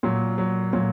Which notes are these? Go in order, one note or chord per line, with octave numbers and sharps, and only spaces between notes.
A#2 F#3
F#3
A#2 F#3